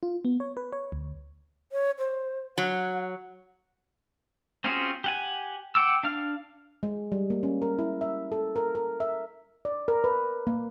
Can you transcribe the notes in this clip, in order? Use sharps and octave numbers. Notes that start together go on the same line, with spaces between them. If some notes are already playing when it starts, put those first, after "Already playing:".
F4
B3
C#5
B4
C#5
D2
C#5
C5
F#3 F#5
C4 C#4 F4 F#4 G#4
G4 F#5 G#5
F#5 G5 D6 E6
D4 F5 F6
G#3
G3
A#3
C#4
A#4
E4
E5
A4
A#4
A#4
E5
D5
A#4
B4
A#3